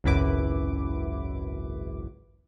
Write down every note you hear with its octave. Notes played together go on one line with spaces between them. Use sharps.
G#1 C#2 F#2 E4 B4 D6